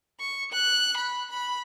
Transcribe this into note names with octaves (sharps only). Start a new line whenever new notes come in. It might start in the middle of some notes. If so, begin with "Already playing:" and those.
C#6
F#6
B5
B5